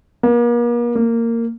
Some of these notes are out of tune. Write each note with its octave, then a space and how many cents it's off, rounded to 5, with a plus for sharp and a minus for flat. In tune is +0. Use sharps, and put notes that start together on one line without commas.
A#3 +40
A#3 -15